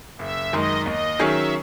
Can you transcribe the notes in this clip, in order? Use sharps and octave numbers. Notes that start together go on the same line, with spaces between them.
F#1 E5
F#2 D#3 G#3 D#5
D#2 D#5
D#3 F#3 C#4 G#4 E5